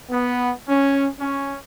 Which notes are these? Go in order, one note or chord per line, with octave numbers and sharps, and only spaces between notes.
B3
C#4
C#4